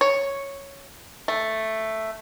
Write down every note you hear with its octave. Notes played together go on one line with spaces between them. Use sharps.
C#5
A3